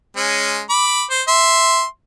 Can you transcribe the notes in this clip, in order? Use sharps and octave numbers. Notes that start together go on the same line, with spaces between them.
G#3 C#4
B5 D6
C5
E5 C6